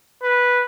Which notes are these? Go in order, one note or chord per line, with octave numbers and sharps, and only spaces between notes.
B4